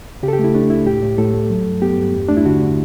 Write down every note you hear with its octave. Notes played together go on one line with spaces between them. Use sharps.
C#3 G4
A4
G4
A3 E4
A3 D4
C#2 E4
A2 G4
A2
A2 A4
A3
F#3
G2
B3 G4
G2
E2
A3 D4
E4
D3 F#4
D3